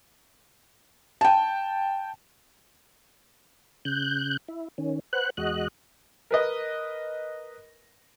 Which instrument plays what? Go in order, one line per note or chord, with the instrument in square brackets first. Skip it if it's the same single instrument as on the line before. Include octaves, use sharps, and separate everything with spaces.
[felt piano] G5 A5
[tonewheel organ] C#3 F#6 G6
E4
D#3 C#4
B4 C5 F#5 F#6
E2 G#3 F#4 D#5 F#6
[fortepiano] A#4 B4 D#5